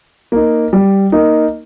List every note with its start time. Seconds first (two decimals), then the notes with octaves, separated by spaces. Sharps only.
0.32 A#3 D#4
0.73 G3
1.12 A#3 D#4